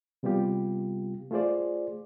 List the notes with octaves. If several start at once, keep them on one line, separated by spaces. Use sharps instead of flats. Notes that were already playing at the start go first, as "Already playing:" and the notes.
C3 G3 B3 F4 G4
A3 F4 G#4 C5 D5